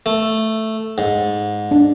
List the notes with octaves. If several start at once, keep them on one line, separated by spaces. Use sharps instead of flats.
A3
G#2
D4